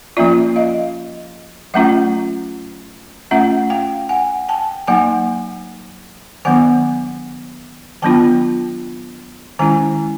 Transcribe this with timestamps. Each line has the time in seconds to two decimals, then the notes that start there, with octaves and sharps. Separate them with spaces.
0.17 F3 A#3 C#4 F4 D5 E5
0.56 D#5 F5
1.74 F#3 A3 C#4 F4 E5 F#5
3.31 A3 C#4 F4 E5 F#5
3.70 F5 G5
4.09 F#5 G#5
4.49 G5 A5
4.87 F#3 A#3 D#4 F#5 G#5
6.45 D#3 F#3 B3 D4 F#5 G#5
8.02 D#3 F#3 B3 D4 F4 G5 A5
9.59 D#3 G#3 C#4 E4 G#5 A#5